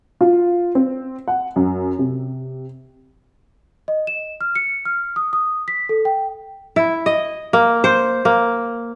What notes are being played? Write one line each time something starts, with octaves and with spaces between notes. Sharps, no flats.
F4
C4
F#5
F#2
C3
D#5
E7
F6
C#7
F6
D#6
D#6
B6
A4
G5
E4
D#5
A#3
C5
A#3